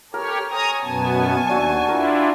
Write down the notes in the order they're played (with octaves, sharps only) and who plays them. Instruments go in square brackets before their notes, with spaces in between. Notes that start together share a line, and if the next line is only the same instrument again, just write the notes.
[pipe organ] G4 C#5 [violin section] A4 F6 [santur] A#4
[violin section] C#5 G#5 C#6 [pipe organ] A#5 D#6
[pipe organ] F#2 B2 B3 [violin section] G#5 A5 C#6
[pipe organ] D#2 [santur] D4 F#4 E5
[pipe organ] D4 E4 F4 [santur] A#4